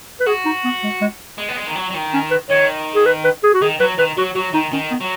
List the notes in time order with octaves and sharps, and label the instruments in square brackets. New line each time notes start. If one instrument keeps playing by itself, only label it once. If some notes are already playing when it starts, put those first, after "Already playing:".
[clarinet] B4
[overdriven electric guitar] F#4 [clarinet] G#4
[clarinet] D#4
B3
G#3
G#3
[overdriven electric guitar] G#3
B3
G#3
D#3
F#3
F#3
D#3
[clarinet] C#4
B4
[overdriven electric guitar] D#3 [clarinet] C#5
[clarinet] G#4
B4
B4
G#4
F#4
[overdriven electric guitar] D#3 [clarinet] G#4
[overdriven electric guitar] F#3 [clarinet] B4
[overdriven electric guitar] D#3 [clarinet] B4
[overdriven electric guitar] F#3 [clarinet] F#4
[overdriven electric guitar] F#3 [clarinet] F#4
[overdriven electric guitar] D#3 [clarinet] D#4
[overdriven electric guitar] D#3 [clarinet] C#4
[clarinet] B3
[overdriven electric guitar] F#3